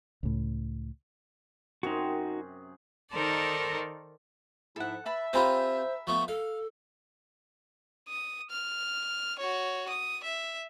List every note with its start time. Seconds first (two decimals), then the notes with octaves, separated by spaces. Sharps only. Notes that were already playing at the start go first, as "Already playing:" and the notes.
0.23 C#2 A2
1.83 F#2 C3 D#4 F#4 G#4
3.12 D#3 D#4 A4 A#4 C5 D5
4.76 G#2 F3 E4 A4 F#5
5.06 B4 E5 A5 B5
5.33 C4 F4 G4 A#4 C5 G#5 B5
6.07 F3 A3 B3 C#6
6.28 A4 F5
8.09 D#6
8.51 F6
9.39 F#4 C#5
9.89 D#6
10.24 E5